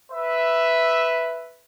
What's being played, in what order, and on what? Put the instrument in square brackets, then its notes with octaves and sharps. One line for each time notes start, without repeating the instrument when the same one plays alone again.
[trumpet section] B4 E5